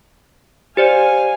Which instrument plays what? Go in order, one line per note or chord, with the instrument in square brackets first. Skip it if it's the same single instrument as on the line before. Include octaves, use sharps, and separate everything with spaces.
[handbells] G4 C5 D5 [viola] F5 G#5